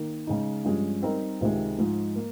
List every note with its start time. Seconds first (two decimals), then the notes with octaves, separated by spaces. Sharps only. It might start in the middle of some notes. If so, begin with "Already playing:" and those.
Already playing: D#3 A#3
0.27 C#3 G#3 D#4
0.64 G2 F3 G#3 C#4 G#4
1.02 G3 C4 D#4 A#4
1.41 C#2 C3 D#3 G#3
1.78 G#2 F3 G#3
2.16 A#3